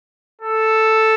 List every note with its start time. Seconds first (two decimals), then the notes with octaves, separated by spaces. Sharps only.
0.42 A4